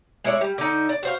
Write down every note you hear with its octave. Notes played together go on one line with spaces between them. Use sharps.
G#3 E4 C#5 D5
G3
D3 D#4
D5
F#4 C5 F5